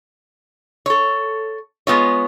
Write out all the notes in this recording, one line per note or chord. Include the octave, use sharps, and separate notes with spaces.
A4 C#5
G#3 B3 F4 C#5